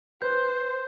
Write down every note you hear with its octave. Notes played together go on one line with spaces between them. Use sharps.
B4 C5 G6